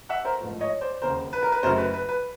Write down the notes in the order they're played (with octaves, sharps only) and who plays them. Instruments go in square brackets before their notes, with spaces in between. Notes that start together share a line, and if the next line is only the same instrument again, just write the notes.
[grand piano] E5 F#5
A#4 C5
A1 G#2 F3 A3
C#5 D#5
C5 D5
E1 D#2 C#3 A#4 C5
B4
A#4
B4
F#1 F#2 C#3 F#3 A3 A#4 C5
B4
B4
B4